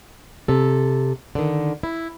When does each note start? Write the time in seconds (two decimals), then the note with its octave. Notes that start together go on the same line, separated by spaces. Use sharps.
0.48 C3 A4
1.35 D3 D#3
1.83 E4